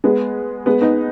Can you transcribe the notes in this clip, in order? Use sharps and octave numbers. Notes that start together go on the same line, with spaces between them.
G#3 B3
G#3 B3
B3 D#4